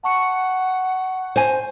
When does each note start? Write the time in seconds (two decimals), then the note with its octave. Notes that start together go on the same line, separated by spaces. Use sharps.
0.04 F#5 A5 C#6 C#7
1.36 C5 G#5